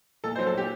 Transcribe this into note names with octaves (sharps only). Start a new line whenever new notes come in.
A#2 A4
C5
F#3
A4
A#2 G4